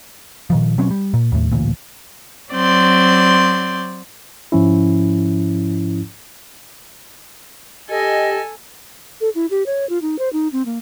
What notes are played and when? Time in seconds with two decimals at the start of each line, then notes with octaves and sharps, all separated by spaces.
0.50 A#2 D#3 F3
0.78 B2 F#3 C4 C#4
0.91 G3
1.14 A#2
1.32 D#2 A2
1.52 A1 D2 A#2
2.52 F#3 C4 D5 C6 G6
4.52 G#2 F3 C#4 E4
7.90 G4 A4 D#5 G#5
9.21 A4
9.35 E4
9.51 G4
9.66 C#5
9.89 F4
10.02 D#4
10.19 C5
10.33 D#4
10.52 C4
10.66 A#3